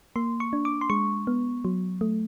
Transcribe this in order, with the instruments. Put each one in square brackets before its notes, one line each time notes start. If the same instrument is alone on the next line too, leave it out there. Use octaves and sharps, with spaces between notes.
[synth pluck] A#3 C6
C#6
D4
D6
C6
G#3 C#6
B3
F#3
A3